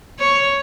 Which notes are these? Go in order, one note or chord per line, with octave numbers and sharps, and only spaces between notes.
C#5